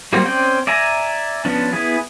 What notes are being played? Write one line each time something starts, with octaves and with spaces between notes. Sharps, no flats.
F#3 G3 A#3 C4 F#4
C4 C#4 D5 G5
D5 E5 G#5 A#5
F3 B3 C#4 D4
B3 E4 G#4